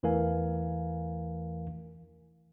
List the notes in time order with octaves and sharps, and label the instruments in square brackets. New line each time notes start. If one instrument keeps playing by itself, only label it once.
[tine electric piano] E2 E3 A3 A#4 F5 G#5